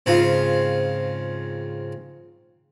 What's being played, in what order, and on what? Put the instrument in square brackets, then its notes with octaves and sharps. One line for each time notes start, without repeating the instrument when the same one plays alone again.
[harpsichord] G#2 C#3 C4 F4